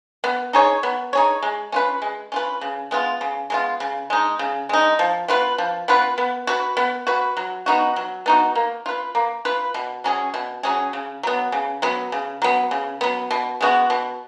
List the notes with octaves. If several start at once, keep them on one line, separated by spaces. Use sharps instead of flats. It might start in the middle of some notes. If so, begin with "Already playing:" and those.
B3
D#4 G#4 C#5
B3
D#4 G#4 C#5
G#3
C#4 F4 B4
G#3
C#4 F4 B4
C#3
G#3 B3 F4
C#3
G#3 B3 F4
C#3
G#3 D#4
C#3
G#3 D#4
F3
B3 F4 B4
F3
B3 F4 B4
B3
F#4 B4
B3
F#4 B4
F#3
B3 D#4 F#4
F#3
B3 D#4 F#4
A#3
F4 B4
A#3
F4 B4
B2
F#3 C#4 G#4
B2
F#3 C#4 G#4
C#3
F#3 B3
C#3
F#3 B3
C#3
F#3 B3
C#3
F#3 B3
B2
G#3 B3 F#4
B2